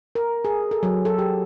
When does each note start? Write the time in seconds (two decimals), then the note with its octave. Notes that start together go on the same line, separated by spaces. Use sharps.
0.15 A#4
0.45 G#4
0.71 A4
0.83 F#3
1.05 A4
1.19 G4